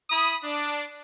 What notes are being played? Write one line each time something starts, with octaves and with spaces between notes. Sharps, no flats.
E4 B5 D#6
D4